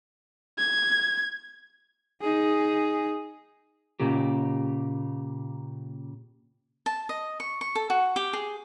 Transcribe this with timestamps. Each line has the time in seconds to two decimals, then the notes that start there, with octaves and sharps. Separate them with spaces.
0.58 G#6
2.21 D#4 G#4
4.00 A#2 C#3 A#3 G4
6.86 A5
7.09 D#5
7.40 C#6
7.61 C#6
7.75 A4
7.90 F#4
8.16 G4
8.33 G#4